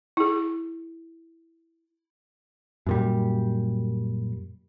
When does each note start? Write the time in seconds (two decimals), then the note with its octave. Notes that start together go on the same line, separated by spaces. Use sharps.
0.17 E4 G#4
2.86 F#2 A#2 G3